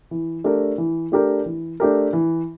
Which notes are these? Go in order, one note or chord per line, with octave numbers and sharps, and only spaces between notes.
E3
A3 D4 G4 A#4
E3
A3 D4 G4 A#4
E3
A3 D4 G4 A#4
E3